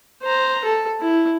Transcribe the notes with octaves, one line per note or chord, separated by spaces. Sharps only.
C5 A#5
A4
E4